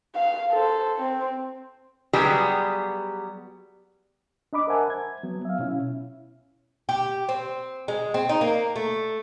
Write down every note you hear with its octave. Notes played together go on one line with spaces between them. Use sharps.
F5
A4 C5
C4
F#3 G3 B3 G4 G#4
D4 D#5 B5 D6
A#4 C5 E5 F#5 G#5 A5
G#6
F#3 B3
E5 F5
B2 C#4 E4
G4
C4
G#3
C4
D#4
A#3
A3